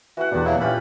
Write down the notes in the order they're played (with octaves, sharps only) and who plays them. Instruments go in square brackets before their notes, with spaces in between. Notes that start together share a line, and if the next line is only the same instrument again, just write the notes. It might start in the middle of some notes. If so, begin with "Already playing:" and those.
[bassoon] E3 [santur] F#4 F#5
[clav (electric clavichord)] E2 B2 [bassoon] G2 [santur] D4
[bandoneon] F#3 A#3 E4
[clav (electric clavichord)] A#2 [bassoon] E3 [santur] C#4 F4 G4 [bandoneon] B5